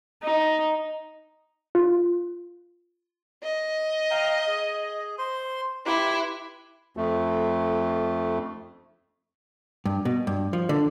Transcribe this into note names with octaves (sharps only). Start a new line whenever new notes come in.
D#4
F4
D#5
F5 G5 A#5
G#4
C5 C6
E4 G4 B4 C6
F2 A3
G2
B2
G2
F3
D3